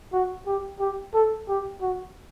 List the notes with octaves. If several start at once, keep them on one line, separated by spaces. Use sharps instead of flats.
F#4
G4
G4
A4
G4
F#4